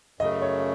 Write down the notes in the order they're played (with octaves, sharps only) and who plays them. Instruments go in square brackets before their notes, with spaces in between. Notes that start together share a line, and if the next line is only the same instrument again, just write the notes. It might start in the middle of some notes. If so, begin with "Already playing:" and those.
[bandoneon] F#2 C#3 A3 [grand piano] D#5
[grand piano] C#5